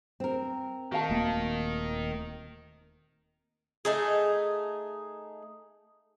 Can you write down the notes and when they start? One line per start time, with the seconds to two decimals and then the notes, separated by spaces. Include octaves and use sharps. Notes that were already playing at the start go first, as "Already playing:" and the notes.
0.20 C4 A#4
0.92 D#3 F#4 F5 A5
1.10 D#1 A3 A#3
3.85 A3 D#4 G#4